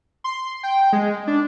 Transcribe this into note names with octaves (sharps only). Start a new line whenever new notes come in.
C6
G5
G#3
D4